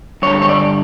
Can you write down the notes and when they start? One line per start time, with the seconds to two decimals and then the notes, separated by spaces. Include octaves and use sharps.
0.22 G2 C#5
0.26 D3
0.42 C#5
0.49 D5